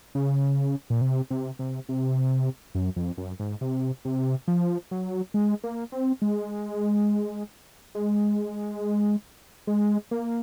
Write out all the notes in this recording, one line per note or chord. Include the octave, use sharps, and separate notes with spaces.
C#3
A#2
C3
C3
C3
C3
F#2
F2
F#2
G#2
C3
C3
F3
F#3
G#3
A#3
C4
G#3
G#3
G#3
A#3